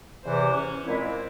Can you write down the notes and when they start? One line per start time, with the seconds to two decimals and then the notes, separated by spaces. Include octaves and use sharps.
0.24 E2 C3 E3 C5
0.55 C#4
0.85 A#2 G#3 C4 E4